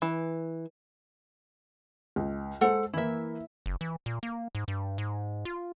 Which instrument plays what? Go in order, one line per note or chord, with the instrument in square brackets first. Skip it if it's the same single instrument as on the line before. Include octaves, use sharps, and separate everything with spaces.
[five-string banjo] E3
[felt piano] C#2
[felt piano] G#3 C5 [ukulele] A4 F#5
[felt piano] E3 A#3 [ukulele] E4 E5
[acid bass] F#1
E3
A#2
A#3
G#2
G2
G#2
F4